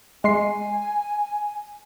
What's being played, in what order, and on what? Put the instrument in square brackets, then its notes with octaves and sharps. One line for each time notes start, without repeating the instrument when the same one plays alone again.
[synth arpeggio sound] G#3 C6 C7 [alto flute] G#5